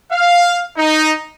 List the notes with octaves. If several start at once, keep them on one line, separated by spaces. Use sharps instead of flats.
F5
D#4